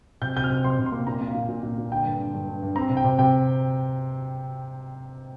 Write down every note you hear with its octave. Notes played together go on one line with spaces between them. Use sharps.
C3 G6
C3 G6
F6
C3
C3 C6
C3
C6
A#3
A#2 A#5
A#3
F5
A#2
A#2
A#2
A#2
D3 G5
G2
D3
G2
G2
G2
C4 A#5
C3
G5
C3
C3 G5